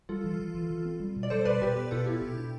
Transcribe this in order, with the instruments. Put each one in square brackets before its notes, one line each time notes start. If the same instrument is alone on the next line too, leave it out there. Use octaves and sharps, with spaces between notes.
[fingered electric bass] G3 [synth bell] F4 A4
[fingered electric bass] E3
E3
E3
E3
C4
G3
B2
[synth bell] D5
[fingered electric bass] G3 [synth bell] A4 C5
[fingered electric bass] B2 [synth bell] B4 D5
[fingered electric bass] B2 [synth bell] G4 B4
[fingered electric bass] B3
[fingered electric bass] B2 [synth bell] F4 A4
[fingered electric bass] B3 [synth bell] E4 G4
[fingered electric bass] B2
D4